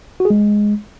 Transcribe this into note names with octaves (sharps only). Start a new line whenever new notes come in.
F#4
G#4
G#3